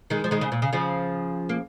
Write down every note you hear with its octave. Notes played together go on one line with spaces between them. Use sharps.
D#3 G#3
F3
D#3 G#3
C#3
A#2
C#3
C#3 F3
A#3